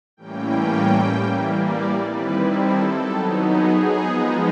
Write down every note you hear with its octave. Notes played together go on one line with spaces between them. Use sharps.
A2 E3 G3 A#3 C#4 G5
E3 G3 A#3
D5
D#3 G3 C4 E4 B4
A4
F#3 B3 D#4
G#4
F3 G#3 B3 D#4